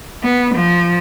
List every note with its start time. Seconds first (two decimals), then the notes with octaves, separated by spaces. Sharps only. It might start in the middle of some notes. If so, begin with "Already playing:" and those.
0.23 B3
0.55 F3